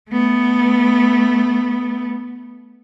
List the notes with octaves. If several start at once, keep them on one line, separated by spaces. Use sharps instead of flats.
A3 B3